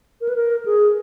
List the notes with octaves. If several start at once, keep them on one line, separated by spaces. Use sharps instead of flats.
A#4
B4
A#4
G#4